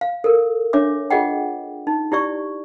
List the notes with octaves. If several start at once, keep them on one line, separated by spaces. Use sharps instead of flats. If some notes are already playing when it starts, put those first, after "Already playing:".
F5
A4 A#4
D4 C#5 E5 D6
F4 G#4 D#5 F#5 G5
D#4
E4 G4 D5 C#6